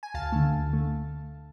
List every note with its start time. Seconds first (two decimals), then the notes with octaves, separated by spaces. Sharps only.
0.03 G#5
0.14 D2 F5 A5
0.32 D3 A3
0.51 D2
0.69 D3 A3